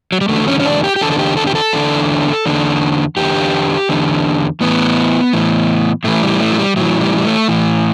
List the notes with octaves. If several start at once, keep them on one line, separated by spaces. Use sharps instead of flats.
F#3
G3
E2 D3 A3
C#4
C#4
D4
G4
G4
E2 D3 A4
A4
G4
A4
G4
A4
E2 D3
E2 D3
E2 D3 G4
E2 D3
A2 E3 B3
A2 E3
A2 E3 A3
G3
A3
F#3
G3
A2 E3 F#3
G3
G3
A3
A2 E3